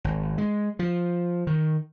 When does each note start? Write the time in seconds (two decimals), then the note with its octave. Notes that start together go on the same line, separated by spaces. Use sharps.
0.04 G#1
0.38 G#3
0.79 F3
1.47 D#3